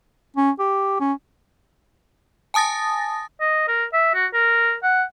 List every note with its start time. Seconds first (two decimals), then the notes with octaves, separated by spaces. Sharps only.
0.36 C#4
0.59 G4
1.00 C#4
2.54 G#5 A5 D#6 A6 A#6
3.40 D#5
3.68 A#4
3.93 E5
4.14 F#4
4.34 A#4
4.83 F#5